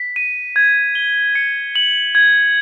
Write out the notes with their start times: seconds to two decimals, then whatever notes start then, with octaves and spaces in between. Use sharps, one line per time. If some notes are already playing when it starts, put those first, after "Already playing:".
Already playing: B6
0.16 D#7
0.56 G#6
0.95 G7
1.35 C#7
1.75 F#7
2.15 G#6